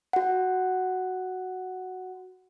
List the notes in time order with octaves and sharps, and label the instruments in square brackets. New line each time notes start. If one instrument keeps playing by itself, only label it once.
[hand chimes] F#4 F#5